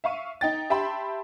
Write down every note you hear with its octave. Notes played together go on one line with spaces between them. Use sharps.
E5 F5 C#6 D#7
D#4 G5 A6
G4 E5 G5 A5 B5 C6